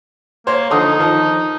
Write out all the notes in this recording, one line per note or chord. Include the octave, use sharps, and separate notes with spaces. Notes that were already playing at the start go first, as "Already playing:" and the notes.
A#3 C5 C#5
D3 F3 D#4 D#6
D#3 F3